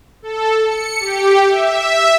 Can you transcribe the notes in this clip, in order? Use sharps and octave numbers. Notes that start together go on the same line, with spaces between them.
A4
C#7
G4
E5